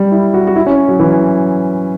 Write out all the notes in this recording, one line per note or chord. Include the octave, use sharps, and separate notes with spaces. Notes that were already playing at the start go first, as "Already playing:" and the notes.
Already playing: G3
E4
F#4
F#4
E4
C#4
F#3
E3